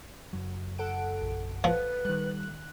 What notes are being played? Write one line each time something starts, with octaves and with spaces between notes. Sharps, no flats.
F#1 F#2 F#3
A4 F#5 D7
A#1
F3 B4
D#3 G3 F#6